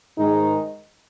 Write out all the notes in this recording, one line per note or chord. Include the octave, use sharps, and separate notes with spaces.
G#2 D#3 G#3 D#4